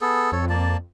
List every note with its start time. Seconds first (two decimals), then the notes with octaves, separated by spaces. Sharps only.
0.01 B3 G#4 A4
0.32 F2 A4 C#5
0.50 A#3 D5 A5